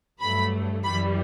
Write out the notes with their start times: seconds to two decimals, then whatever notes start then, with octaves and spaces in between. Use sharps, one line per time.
0.20 G2 F#3 A3 B5
0.83 F#2 E3 G3 B5